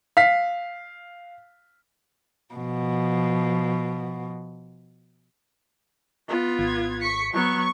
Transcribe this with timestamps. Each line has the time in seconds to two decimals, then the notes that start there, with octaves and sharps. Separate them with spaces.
0.17 F5 B6
2.54 B2 F3
6.28 B3 F4
6.59 G#1 G#6
7.01 C#6 B6 C#7
7.33 F#3 B3 C#6